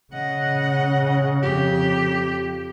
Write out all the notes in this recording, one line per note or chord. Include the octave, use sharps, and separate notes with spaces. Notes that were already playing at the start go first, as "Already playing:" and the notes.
C#3 D#5 F#5
F2 G4